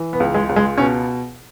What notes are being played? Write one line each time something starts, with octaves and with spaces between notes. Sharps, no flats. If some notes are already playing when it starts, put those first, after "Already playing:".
Already playing: E3
B3
C#2
G#3
C#2
G#3
B2 C#4